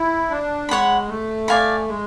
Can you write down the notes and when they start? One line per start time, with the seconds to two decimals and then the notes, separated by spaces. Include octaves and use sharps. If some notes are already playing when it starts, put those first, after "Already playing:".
Already playing: E4
0.30 D4
0.69 G#3 C#5 F#5 B5
1.08 A3
1.48 D5 F5 G#5 B5
1.88 G#3